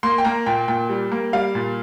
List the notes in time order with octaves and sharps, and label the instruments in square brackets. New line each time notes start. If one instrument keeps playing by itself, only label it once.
[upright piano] A#3 C6
G5
A#3 A#5
A#2 G5
A#2 G5
G3
A#3
G3 F5
A#2